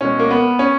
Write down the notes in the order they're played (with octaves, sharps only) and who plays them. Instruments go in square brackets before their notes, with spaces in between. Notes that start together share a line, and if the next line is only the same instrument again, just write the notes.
[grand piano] B2 G#3 C#4
A#3
B3
C#4